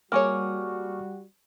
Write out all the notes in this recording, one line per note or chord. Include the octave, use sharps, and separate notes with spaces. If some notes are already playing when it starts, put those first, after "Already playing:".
G3 A#3 F#4 G#4 C#5 C#6 D6 F6